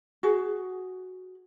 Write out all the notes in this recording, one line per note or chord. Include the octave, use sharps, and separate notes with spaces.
F#4 G#4